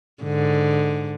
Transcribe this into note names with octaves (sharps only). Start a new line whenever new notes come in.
G#2 D3